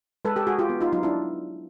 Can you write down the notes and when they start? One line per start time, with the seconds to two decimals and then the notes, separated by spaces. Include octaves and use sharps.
0.25 G#3 A4 B4
0.36 G4 A4
0.47 G#3 F#4 G#4
0.59 F4 G4
0.70 B3
0.81 D#4 F4
0.92 F#3 D#4 F4
1.03 D4 E4